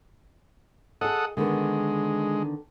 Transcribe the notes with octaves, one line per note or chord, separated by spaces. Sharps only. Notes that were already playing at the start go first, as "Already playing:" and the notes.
G#4 A4 D#5 F#5 D#6
D3 D#3 G#3 B3